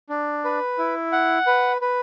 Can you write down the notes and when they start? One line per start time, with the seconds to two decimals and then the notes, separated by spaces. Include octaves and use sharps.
0.09 D4
0.45 B4
0.78 E4
1.12 F#5
1.47 B4
1.82 B4